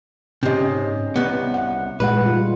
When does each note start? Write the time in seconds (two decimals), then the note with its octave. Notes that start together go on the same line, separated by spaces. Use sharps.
0.43 G#2 C3 C#4 D#5
1.16 C2 B3
1.54 F#5
2.00 A#2 G#3 B4 F#5
2.22 G3 F4